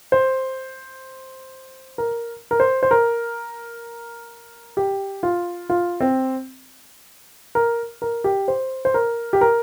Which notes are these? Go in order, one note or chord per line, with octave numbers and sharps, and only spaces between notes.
C5
A#4
A#4
C5
C5
A#4
G4
F4
F4
C4
A#4
A#4
G4
C5
C5
A#4
G4
A#4